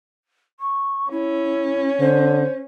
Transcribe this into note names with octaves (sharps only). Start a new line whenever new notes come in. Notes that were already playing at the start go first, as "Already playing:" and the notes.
C#6
C#4 E4
D3 C5